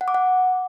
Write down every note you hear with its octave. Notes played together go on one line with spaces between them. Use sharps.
F#5
D6
F#5